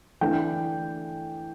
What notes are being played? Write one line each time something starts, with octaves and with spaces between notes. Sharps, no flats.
E3 A3 D4 G5